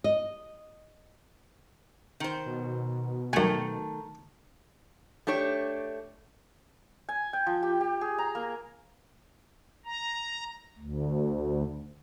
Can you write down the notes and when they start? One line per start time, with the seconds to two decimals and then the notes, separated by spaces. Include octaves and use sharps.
0.04 D#5
2.20 D#3 C5
2.46 B2
3.33 F#2 D#3 A3 G#5
5.27 A3 D4 G4 C#5
7.09 G#5
7.33 G5
7.46 F3
7.63 G4
7.81 G4
8.01 G#4
8.18 A#5
8.35 A#3
9.86 A#5
10.79 D2